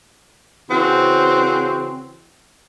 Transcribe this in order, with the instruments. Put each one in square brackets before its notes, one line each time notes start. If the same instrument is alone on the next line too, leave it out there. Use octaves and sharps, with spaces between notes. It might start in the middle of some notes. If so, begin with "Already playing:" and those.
[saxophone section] C#3 E3 C4 F#4 C5